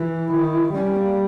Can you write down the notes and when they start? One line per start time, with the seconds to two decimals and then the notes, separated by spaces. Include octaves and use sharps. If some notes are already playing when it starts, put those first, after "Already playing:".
Already playing: E3 E4
0.31 D#3
0.74 G3 C#4
0.96 A#3